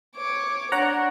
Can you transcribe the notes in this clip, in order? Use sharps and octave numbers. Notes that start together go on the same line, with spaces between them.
C#5 D6
D4 C#5 F#5 A#5